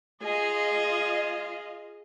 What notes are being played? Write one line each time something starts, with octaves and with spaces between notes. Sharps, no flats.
F4 G#4 D#5 F5